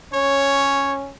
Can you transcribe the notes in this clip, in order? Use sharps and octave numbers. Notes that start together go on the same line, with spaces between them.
C#4 C#5